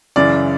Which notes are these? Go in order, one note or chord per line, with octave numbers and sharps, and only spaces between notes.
F#2 C#3 E3 D5